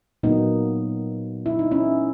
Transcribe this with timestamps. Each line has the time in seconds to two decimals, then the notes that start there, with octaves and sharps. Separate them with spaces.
0.23 A#2 F#3 A#3 B3 D#4
1.46 E4
1.59 D#4
1.71 C#4 E4